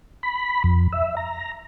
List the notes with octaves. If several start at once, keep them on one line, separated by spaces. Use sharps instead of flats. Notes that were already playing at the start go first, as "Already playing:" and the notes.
B5
F2
E5
A#5